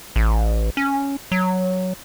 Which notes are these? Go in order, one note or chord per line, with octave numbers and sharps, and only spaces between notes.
A1
C#4
F#3